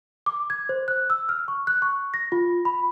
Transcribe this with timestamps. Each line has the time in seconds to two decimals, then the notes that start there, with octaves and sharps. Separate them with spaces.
0.26 D6
0.50 G#6
0.69 C5
0.88 F#6
1.10 E6
1.29 F6
1.48 C#6
1.67 F#6
1.82 C#6
2.14 A#6
2.32 F4
2.65 B5